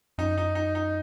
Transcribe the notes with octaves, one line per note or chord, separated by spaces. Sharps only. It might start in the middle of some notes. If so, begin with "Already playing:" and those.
F#2 D#4
D#4
D#4
D#4